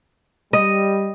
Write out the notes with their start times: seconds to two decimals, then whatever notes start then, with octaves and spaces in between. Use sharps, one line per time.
0.53 G3 D#5